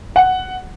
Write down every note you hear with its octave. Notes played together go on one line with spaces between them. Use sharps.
F#5